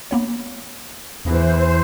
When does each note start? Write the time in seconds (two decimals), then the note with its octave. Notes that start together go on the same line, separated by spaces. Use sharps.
0.11 A#3 B3 C#5
1.25 E2 E3 C5